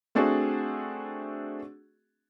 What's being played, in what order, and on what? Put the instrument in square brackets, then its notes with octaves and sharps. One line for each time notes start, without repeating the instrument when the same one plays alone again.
[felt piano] A3 C4 D4 F#4 G#4